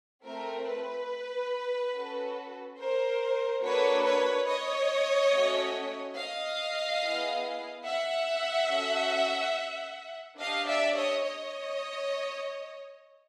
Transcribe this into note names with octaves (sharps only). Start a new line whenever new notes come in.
A3 C4 F4 A#4
B4
C#4 F#4 A4
A#4 C5
A#3 D4 F#4 A4 B4 C#5
B4 C#5
C#5 D#5
A3 C#4 F#4
D#5 F5
B3 E4 G#4
E5 F#5
C#4 F#4 A4
D4 G4 D#5 F5
D5 E5
C#5 D#5
C#5 D#5